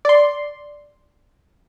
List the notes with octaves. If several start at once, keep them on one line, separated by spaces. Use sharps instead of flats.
D5 C6